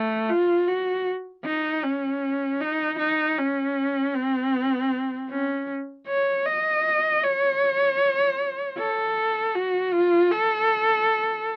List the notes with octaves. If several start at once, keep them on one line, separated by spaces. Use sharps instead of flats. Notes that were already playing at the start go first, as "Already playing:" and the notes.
Already playing: A3
F4
F#4
D#4
C#4
D#4
D#4
C#4
C4
C#4
C#5
D#5
C#5
A4
F#4
F4
A4